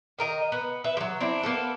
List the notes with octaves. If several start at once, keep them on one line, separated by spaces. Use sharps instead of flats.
D#3 A#4 D#5
B3
B4 E5
F3 F#3
C4 D4 E4
A#3 B3 A4